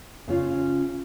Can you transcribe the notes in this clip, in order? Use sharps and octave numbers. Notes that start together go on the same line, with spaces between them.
C#3 C#4 F4